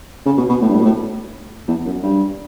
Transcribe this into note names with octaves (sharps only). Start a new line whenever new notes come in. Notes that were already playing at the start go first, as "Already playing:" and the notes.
C#3
B2
B2
A2
G2
A2
B2
A2
E2
F#2
G2